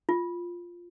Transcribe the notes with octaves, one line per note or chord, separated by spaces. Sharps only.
F4